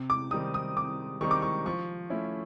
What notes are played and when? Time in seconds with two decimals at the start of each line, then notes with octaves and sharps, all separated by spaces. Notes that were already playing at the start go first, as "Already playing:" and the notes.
Already playing: C3
0.10 D6
0.31 D#3 G3 C4 D#4 D#6
0.54 D#6
0.77 C3 D6
1.21 D#3 G3 C4 D#4 C#6
1.31 D6
1.42 C#6
1.66 F3 C#6
2.10 A3 C#4 E4